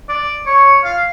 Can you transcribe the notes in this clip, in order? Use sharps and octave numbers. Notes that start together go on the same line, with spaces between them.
D5
C#5
F5